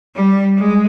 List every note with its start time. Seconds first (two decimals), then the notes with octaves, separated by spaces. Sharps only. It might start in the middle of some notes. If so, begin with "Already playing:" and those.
0.16 G3
0.58 G#3